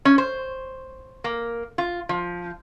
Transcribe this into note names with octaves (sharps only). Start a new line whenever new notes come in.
C#4
C5
A#3
F4
F3